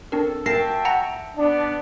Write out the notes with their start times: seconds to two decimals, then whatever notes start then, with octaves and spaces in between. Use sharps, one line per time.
0.12 C4 D4 A4 A#4
0.46 F#4 A#4 E5 G5 A5 A#6 C7
0.85 F#5 A#5 A#6
1.37 B3 D4 D5